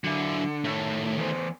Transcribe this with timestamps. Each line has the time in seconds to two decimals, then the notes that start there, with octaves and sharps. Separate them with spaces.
0.04 D3 F#3 E4
0.64 A2 D#3 A3
1.18 E2 C5